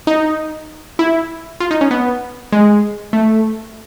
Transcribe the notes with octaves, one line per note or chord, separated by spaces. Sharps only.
D#4
E4
F4
D#4
C#4
B3
G#3
A3